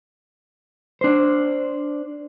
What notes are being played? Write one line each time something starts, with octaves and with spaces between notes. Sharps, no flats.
D4 C5